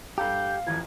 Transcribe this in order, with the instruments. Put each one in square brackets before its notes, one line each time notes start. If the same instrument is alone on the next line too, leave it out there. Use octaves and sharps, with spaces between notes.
[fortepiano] G2 A4 A#5 [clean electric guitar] G4 [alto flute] F5 [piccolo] G6
[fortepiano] A1 F2 E3 [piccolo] G#6